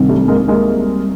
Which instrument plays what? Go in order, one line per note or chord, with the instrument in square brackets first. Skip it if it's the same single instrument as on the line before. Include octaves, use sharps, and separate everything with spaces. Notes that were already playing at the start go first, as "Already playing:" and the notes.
Already playing: [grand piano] C2 C3 D#3
G3 A3
G#3 A#3
G#3 A#3